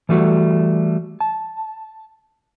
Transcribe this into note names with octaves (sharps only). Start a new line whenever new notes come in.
E3 G3 A3 F#4
A5